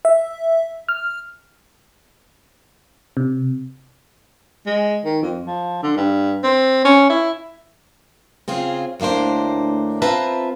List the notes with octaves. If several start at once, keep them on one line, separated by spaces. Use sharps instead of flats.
E5
F6
C3
G#3
D#3
F2
F3
D3
G2
C4
C#4
E4
C#3 C4 F4 G#4
D2 A2 A#3 D4 C5
C4 F4 B4 E5 A5 A#5